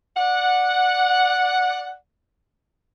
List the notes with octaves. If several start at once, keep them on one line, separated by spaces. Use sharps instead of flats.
D5 F#5